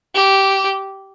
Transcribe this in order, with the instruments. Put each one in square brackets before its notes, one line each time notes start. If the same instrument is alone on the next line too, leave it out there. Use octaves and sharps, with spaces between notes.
[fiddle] G4